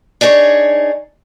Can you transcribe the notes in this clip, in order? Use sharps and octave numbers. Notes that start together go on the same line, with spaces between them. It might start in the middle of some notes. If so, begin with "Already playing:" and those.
D4 D#4 G#4 C5 C#5